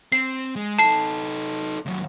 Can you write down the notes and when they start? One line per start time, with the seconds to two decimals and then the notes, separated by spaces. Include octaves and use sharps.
0.12 C4 C7
0.56 G#3
0.79 D#4 A4 A5 C7
1.86 D#2 F#3